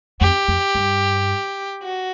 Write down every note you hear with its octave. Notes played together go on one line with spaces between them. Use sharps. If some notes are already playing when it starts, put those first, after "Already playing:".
F2 G4
F2
G2
F#4